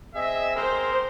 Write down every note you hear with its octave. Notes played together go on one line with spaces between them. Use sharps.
C4 G#4 D#5 E5
A#4 C5 C6